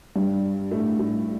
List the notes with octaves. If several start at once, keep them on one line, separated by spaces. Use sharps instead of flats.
G2 G3
A2 A3
A2 A3